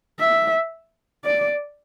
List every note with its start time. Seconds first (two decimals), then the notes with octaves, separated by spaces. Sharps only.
0.20 E5
1.25 D5